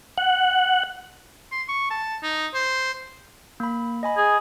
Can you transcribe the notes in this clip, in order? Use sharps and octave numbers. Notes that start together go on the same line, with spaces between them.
F#5
C6
C#6
A5
D#4
C5
A#3 B5
D#5 G#5 B5
G#4